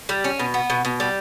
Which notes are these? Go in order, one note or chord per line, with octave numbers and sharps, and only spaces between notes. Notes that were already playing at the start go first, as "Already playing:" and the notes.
G3
C#4
B2
B3
B2
B2
G3